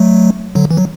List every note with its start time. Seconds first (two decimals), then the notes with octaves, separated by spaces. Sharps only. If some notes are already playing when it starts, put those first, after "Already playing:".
Already playing: F#3 A3
0.55 D3 F#3
0.71 E3
0.77 F#3